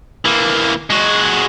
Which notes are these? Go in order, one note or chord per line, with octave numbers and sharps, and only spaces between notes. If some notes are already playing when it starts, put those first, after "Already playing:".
E3 A#3
G#3 F#4